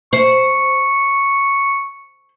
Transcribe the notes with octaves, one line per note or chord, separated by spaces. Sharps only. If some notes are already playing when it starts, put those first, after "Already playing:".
C5 C#6